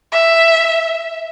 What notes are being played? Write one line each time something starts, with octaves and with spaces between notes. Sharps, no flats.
E5